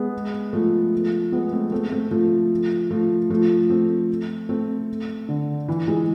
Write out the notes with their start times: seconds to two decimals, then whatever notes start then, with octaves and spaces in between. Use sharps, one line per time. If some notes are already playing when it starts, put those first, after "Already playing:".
Already playing: G#3 B3
0.53 F3 A3
1.32 G#3 B3
1.52 A3 C4
1.71 A3 C4
1.92 A3 C4
2.11 F3 A3
2.91 F3 A3
3.30 F3 A3
3.70 A3 C4
4.49 A3 C4
5.29 D3
5.68 E3
5.87 E3 G#3